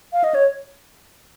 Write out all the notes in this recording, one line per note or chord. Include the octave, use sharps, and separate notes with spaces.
F5
D#5
C#5